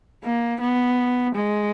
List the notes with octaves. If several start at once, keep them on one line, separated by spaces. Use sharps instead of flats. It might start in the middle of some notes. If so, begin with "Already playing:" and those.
A#3
B3
G#3